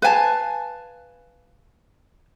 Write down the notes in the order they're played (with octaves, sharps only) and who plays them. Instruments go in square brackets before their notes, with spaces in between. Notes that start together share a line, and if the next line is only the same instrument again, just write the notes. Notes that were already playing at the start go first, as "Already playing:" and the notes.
[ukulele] B4 F5 G#5 A5